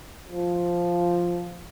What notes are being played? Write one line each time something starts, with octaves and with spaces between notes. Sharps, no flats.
F3